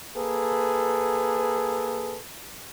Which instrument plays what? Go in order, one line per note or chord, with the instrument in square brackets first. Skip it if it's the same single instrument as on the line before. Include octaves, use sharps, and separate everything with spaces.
[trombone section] A#3 G#4 A4 B4